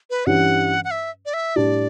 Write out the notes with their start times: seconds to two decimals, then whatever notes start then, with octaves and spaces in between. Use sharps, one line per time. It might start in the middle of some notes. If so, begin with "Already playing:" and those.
0.10 B4
0.26 G2 E3 G3 C#4 F#5
0.85 F#5
0.91 E5
1.26 D5
1.34 E5
1.56 A2 G3 D4 G4 D5